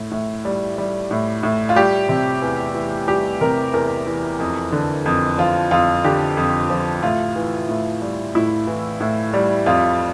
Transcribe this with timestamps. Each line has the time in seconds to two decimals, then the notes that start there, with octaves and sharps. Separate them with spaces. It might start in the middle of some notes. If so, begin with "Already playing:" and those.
Already playing: A2
0.12 A2
0.45 G3
0.78 G3
1.11 A2
1.43 A2
1.69 F4
1.76 G3 G4
2.09 C3
2.42 E2
2.75 E3
3.08 G3 G4
3.41 C3 A#4
3.73 E2 A#4
4.07 E3
4.40 F2
4.72 D3
5.06 F2
5.38 F3 F4
5.71 F2 F4
6.04 D3 G4
6.37 F2
6.70 F3
7.02 A2 F4
7.36 E3
7.69 A2
8.02 G3
8.35 A2 E4
8.67 E3
9.00 A2
9.34 G3
9.66 F2 F4